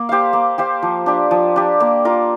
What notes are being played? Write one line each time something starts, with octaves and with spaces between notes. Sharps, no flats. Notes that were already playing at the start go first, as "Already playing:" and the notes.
Already playing: A#3
G4 C5 F5
A#3
G4 C5 F5
F3
D4 G4
F3
D4 G4
A#3
F4 A#4